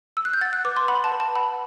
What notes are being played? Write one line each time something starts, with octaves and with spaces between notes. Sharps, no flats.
E6
F#6
G6
F#5 A6
F#6
B4 D6
C6
F#5 B5
A5
B4
A5
F#5 B5